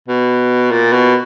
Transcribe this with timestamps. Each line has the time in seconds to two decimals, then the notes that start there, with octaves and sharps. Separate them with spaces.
0.08 B2
0.71 A#2
0.93 B2